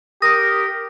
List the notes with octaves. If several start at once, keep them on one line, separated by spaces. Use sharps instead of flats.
G4 A#4 D#6 A#6